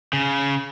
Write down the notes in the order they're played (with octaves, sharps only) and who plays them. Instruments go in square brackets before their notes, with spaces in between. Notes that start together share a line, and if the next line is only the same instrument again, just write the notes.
[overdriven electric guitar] C#3